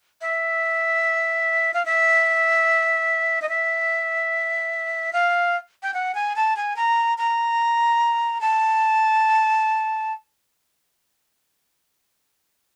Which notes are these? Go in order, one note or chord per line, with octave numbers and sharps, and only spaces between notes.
E5
F5
E5
D#5
E5
F5
G5
F#5
G#5
A5
G#5
A#5
A#5
A5